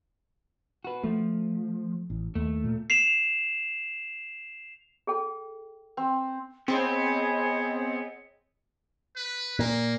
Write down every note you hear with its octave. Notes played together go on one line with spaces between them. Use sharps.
F#4 B4
F3 A3
A1
D#2 A3
A#2
C7 E7 F7
G#4 A4 G5
C4
B3 C4 G#4 C#5 D#5
B4
A#2 A#3